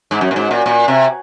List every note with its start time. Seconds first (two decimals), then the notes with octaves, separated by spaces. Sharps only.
0.11 G#2
0.21 F#2
0.31 A#2
0.36 G#2
0.51 A#2
0.66 A#2
0.88 C3